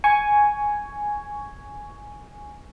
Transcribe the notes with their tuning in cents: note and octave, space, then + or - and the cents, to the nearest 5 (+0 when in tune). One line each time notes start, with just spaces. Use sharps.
G#5 +0 C#6 +10